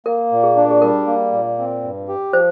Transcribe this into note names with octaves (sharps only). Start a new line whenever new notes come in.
A#3 A#4
A#2
G#4
D4
G#4
G3 A#4
A#3
A#2
C4
G2
G4
F3 C5